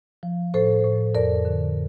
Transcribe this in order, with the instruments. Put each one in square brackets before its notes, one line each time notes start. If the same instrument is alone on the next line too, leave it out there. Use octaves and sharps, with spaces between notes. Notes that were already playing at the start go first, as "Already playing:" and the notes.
[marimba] F3
A2 A4 C5
A2
F2 A#4 D5
D3